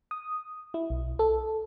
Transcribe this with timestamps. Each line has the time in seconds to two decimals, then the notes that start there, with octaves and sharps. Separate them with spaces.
0.11 D#6
0.74 E4
0.90 B1
1.19 A4